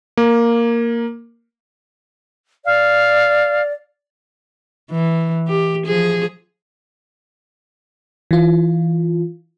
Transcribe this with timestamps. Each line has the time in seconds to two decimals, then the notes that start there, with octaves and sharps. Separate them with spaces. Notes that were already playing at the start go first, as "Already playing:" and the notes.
0.17 A#3
2.65 D5 F5
4.91 E3
5.48 G4
5.86 F3 G#4
8.31 E3 F4